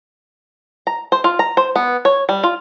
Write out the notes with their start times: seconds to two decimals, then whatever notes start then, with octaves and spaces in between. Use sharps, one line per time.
0.87 A#5
1.12 C5
1.24 F4
1.39 A#5
1.57 C5
1.76 B3
2.05 C#5
2.29 G3
2.43 F4